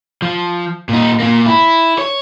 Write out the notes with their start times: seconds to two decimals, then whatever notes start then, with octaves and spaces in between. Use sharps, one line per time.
0.22 F3
0.89 A#2 D#4
1.20 A#2 A#3
1.46 E4
1.98 C#5